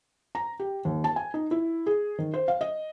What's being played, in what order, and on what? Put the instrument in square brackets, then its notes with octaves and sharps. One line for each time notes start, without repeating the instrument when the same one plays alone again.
[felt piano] A#5
G4
D#2
A5
G#5
D#4
E4
G#4
D#3
C5
F5
D#5